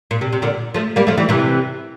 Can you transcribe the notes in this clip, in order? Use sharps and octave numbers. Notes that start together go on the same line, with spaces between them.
A#2
C3
C3
A#2 D3
F3 A3
G3 A#3
F3 A3
E3 G3
C3 E3